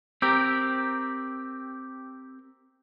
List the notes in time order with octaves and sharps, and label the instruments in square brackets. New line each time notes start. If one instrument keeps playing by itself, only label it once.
[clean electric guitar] C4 G4 A#4 [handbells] D6 E6 G6